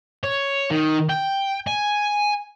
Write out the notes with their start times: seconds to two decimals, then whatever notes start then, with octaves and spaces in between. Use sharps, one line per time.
0.24 C#5
0.71 D#3
1.09 G5
1.67 G#5